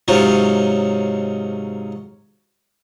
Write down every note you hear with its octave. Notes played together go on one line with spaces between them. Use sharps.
G#2 C3 F#3 C#4 D#4 F4